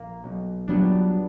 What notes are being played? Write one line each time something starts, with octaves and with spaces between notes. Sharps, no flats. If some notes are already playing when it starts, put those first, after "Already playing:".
Already playing: A#1 A#3
B1
A#2 F#3 G3 B3 D4